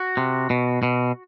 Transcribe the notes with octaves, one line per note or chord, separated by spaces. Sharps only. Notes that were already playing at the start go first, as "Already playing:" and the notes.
Already playing: F#4
C3
B2
B2